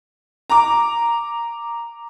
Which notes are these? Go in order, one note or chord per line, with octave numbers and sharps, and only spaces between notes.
A#5 D6